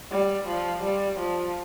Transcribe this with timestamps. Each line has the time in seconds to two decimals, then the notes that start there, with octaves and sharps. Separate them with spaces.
0.11 G3
0.48 F3
0.84 G3
1.19 F3